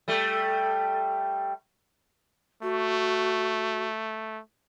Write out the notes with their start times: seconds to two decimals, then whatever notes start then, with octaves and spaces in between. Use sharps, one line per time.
0.08 G3 A3
2.63 A3 F#4